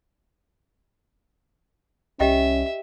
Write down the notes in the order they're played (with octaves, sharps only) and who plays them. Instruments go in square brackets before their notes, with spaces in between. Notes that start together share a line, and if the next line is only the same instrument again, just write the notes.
[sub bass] C2 [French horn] C#4 [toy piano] G4 D#5 G5 [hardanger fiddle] E5